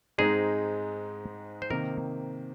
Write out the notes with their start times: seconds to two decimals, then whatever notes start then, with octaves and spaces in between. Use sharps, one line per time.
0.18 G#2 G#3 C4 D#4 G#4
1.62 C5
1.70 C3 D#3 A#3 A#4